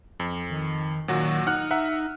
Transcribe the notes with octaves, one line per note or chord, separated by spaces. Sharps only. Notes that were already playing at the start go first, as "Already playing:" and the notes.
F2
D#3
A#2 D#3 F#3 F#4
D#4 F#5 F6 F#6
E5 F#5 A#5